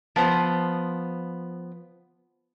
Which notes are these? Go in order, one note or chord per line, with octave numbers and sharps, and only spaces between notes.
F3 B3 C5